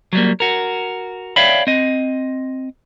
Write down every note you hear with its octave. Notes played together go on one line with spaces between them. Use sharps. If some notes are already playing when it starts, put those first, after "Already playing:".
F#3 G3 A#3
F#4 A#4
C#5 D5 E5 F5 G5 B5
C4 D#5